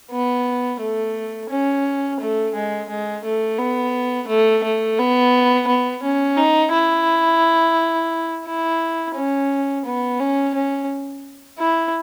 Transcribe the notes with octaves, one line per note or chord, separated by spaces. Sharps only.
B3
A3
C#4
A3
G#3
G#3
A3
B3
A3
A3
B3
B3
C#4
D#4
E4
E4
C#4
B3
C#4
C#4
E4